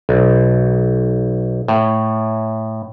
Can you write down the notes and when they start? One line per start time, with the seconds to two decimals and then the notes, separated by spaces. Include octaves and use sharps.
0.09 B1
1.68 A2